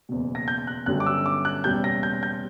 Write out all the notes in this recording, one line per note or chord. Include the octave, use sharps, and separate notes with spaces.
F#1 E2 B2
A#6
G6
F#6
G1 F#2 D3 G3 F#6
D6
E6
D6
F#6
F#1 E2 B2 G3 C#4 G6
A#6
G6
G6